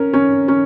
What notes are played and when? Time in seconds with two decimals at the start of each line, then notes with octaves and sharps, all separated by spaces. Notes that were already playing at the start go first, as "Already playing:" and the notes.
Already playing: C#4 A#4
0.13 C#4
0.48 C#4